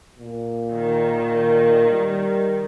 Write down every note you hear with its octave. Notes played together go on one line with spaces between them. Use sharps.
A#2
D#3
G3